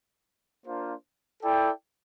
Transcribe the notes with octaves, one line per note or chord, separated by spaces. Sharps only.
A#3 D4 F4 C5
E4 A4 D5 G5